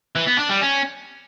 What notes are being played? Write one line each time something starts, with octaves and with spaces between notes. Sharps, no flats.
E3
B3
D4
G3
C#4